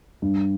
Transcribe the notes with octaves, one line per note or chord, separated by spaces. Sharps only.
G2